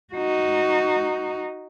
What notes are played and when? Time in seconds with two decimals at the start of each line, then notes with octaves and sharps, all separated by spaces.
0.14 D#4 F#4